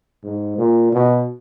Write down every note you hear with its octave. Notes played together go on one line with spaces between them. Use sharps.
G#2
A#2
B2